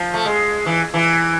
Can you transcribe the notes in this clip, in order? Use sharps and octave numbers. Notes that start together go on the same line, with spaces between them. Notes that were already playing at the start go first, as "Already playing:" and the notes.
Already playing: F3
A3
G#3
E3
E3